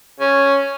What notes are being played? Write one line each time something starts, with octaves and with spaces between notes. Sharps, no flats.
C#4